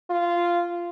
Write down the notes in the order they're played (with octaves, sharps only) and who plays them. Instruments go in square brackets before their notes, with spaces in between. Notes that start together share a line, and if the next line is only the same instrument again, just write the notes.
[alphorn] F4